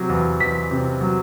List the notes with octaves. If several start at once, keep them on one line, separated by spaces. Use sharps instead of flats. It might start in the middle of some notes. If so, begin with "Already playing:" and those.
Already playing: C3 F#3
E2
E2 B6
C3
F#3